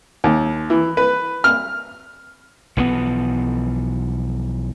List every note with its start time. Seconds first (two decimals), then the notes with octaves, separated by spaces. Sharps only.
0.24 D#2
0.70 E3
0.97 B4
1.44 F6
2.77 B1 E3 F3 B3